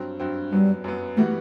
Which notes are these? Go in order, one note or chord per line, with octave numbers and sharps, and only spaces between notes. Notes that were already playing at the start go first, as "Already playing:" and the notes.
Already playing: G2 F#3 C4
G2 F#3 C4
F#2 F#3 G3 B3
F#2 F#3 B3
E3 G3 A3 B3 F#4